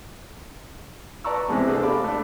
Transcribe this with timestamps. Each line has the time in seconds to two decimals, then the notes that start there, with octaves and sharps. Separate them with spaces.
1.24 B4 D5 A5 A#5 C#6 E6
1.48 C3 E3 G#3 A3 B3
1.68 D4 G#4 A4 C5
1.83 G4 D5 F5 B5 D6
2.04 A3 D4